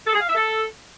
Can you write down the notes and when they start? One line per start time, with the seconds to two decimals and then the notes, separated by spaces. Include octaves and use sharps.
0.06 A4
0.13 G#4
0.20 F5
0.28 E5
0.35 A4